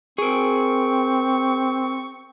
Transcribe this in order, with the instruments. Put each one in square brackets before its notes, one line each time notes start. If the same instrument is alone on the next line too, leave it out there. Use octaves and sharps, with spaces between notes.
[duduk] C4 [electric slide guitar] G#4 A#4 [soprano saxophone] C#6